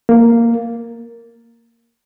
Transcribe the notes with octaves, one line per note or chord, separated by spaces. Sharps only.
A#3